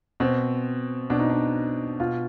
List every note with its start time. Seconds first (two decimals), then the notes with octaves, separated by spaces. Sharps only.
0.20 B2 C4
1.10 B2 D4
1.19 D#4
1.30 D4
2.00 B2 F4